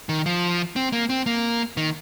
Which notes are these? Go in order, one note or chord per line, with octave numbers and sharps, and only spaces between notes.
D#3
F3
C4
A#3
C4
A#3
D#3